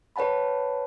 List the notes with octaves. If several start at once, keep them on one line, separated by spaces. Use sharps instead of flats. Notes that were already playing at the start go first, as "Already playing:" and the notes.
B4 C#5 F#5 A5 B5